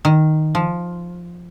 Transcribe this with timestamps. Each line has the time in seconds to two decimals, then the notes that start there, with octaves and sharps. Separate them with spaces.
0.05 D#3
0.55 F3